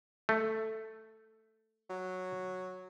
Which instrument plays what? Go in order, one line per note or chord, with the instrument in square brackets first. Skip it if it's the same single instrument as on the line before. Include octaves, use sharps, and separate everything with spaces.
[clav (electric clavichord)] A3
[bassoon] F#3